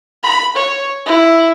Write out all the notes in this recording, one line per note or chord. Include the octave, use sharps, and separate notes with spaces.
B5
C#5
E4